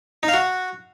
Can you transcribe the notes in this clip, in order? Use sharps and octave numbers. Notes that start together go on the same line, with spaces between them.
D#4
F5
F#4